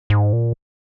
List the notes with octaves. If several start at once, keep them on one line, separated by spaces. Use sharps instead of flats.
G#2
A#2